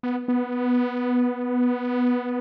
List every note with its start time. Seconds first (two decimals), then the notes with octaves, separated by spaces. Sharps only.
0.03 B3
0.28 B3